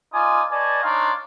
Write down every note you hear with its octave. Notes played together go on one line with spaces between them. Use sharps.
D#4 F4 D5 G#5 D#6
B4 D5 D#5 G#5 A5 C#6
D4 D#4 C#5 D5 F5 C6